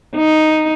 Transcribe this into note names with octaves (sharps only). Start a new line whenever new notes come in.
D#4